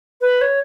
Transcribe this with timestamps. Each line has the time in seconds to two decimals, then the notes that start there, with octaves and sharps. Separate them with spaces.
0.21 B4
0.41 C#5